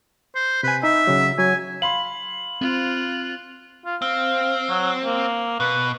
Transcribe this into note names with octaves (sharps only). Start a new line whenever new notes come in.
C5
C3 B4 G#5
D#4 E5
C#3 F#3
F#3 G#5
F5 B5 C6 F#7
C4 F4 F#6
F4
C4 F5
F#3
A#3
B2 B4